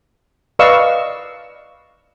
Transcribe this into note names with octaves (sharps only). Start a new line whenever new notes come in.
B4 D5 D#5 F5 C#6 E6